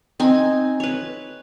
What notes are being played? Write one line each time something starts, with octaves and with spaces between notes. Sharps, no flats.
C4 D#4 G#5
B4 C#5